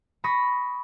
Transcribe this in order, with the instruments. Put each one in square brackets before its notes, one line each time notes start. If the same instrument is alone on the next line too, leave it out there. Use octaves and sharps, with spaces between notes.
[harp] B5 C#6 D#6 A#6 B6